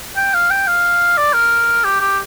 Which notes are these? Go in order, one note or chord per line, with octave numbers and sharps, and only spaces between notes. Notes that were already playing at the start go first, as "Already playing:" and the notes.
G5
F5
G5
F5
D5
A#4
G4
G4